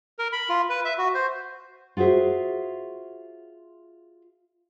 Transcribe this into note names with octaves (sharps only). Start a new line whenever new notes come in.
A#4
B5
F4
B4
E5
F#4
C5
F4 F#4 G#4 C5 E5